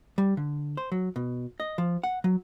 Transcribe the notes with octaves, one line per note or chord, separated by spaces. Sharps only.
G3
D3
C5
F#3
B2
D#5
F3
F#5
F#3